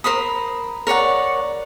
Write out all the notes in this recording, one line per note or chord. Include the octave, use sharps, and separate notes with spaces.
A#4 C5 B5 D#6
A#4 C#5 D5 F#5